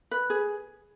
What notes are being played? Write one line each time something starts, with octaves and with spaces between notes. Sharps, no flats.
B4
G#4